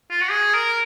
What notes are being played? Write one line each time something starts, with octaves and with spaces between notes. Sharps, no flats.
F4
F#4
G#4
A#4